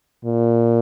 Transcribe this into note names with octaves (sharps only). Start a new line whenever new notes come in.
A#2